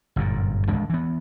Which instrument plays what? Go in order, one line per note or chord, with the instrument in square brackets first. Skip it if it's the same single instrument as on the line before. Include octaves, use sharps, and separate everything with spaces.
[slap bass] G1 F#2 A#2
G#1 F2 G#3 D4
E3 B3